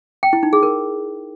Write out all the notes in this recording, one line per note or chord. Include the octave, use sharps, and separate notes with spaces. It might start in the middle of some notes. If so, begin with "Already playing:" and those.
G5
E4
D#4
G#4
A#4